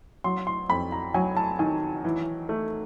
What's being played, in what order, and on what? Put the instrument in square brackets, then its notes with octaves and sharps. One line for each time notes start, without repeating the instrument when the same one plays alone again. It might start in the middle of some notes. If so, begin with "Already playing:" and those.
[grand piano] F#3 C6
C6
F2 B5
A#5
F#3 G#5
A5
D#3 G#5
E3
A3